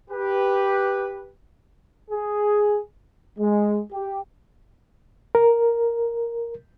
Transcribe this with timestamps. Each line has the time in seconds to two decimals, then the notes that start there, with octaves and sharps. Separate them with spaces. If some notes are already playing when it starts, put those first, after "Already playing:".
0.10 G4 B4
2.11 G#4
3.39 G#3
3.91 G4
5.35 A#4